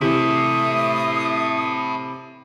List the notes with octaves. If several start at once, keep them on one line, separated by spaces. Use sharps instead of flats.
C3 E3 E4 A4 E5 D#6